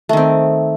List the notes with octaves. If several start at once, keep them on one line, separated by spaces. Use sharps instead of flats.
D#3 A3 C4